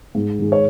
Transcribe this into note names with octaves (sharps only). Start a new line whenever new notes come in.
G#2
D#3 G#3
C#5